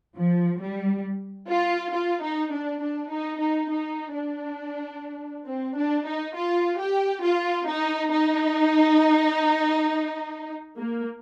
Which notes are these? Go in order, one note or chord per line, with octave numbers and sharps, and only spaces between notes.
F3
G3
F4
F4
D#4
D4
D4
D#4
D#4
D#4
D4
C4
D4
D#4
F4
G4
F4
D#4
D#4
A#3